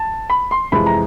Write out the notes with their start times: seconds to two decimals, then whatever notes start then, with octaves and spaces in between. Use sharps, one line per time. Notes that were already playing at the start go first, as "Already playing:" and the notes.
Already playing: A5
0.30 B5
0.51 C6
0.72 F2 C3 E3 G#3 B5
0.86 A#5